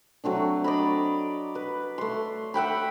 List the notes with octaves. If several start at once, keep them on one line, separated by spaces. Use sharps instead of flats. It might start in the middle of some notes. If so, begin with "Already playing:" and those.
F#3 A3 C4 D4
D5 D#5 A#5 B5
B4
A3 C6
E5 F#5 G5 B5